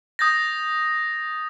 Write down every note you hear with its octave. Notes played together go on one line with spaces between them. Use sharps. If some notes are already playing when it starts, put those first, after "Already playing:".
D#6 G6 A6 A#6